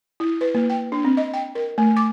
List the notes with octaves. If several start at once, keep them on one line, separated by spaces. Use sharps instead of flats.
E4
B4
A#3
G5
D4
C4
D#5
G5
A#4
A3
D6